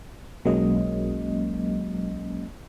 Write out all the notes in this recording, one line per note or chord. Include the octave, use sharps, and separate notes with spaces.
B1 F#3 G#3 A#3 C#4 D#5